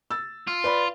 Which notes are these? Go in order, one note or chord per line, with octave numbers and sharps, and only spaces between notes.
E6 A6
F4
B4 D5 B5